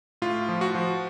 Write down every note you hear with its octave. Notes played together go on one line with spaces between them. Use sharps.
A2 F4
F3
F#4
F3